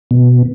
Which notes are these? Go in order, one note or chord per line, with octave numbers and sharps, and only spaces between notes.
B2